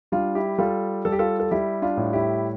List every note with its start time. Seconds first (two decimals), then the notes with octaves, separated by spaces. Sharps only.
0.12 G3 D4 F4
0.35 E4 G4
0.58 G3 F4 A4
1.05 G3 A4
1.12 G4
1.19 F4 A4
1.40 A4
1.51 G3 E4 G4
1.82 D4 F4
1.97 A2
2.13 E4 G4